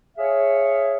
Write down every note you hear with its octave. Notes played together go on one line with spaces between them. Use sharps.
G#4 C#5 E5 F5